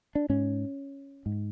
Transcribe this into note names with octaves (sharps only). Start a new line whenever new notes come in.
D4
G#2 C#4
G#2